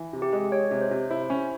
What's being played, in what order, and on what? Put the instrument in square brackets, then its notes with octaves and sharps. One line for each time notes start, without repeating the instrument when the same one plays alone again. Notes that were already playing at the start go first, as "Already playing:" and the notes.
Already playing: [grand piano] E3
C3
[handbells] G4
[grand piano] G#3
[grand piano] G#3 [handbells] C#5
[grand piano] C3
[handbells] C5
[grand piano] C3
[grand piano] E4 [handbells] C5
[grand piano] C#4